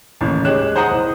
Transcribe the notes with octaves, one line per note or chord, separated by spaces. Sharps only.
A1 D#2 C#3
G#3 G4 C#5 F#6 E7
G#4 C5 D#5 F#5 A#5 D#6
C2